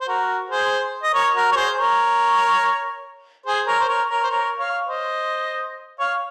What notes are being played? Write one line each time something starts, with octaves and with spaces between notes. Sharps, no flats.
C5
F#4 A#4
G#4 C5
D#5
A#4 C#5
F#4 A#4
C#5
G#4 C5
A#4 C#5
G#4 C5
A#4 C#5
C5
A#4 C#5
A#4 C#5
C5
A#4 C#5
C#5 F5
C5 D#5
C#5 F5